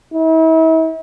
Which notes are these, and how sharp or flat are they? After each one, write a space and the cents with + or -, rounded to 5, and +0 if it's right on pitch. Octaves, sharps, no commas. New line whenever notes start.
E4 -40